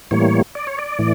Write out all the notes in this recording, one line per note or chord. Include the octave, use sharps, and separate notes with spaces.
A2 E3 G3 A#3 C#5
D5
C#5
D5
A2 E3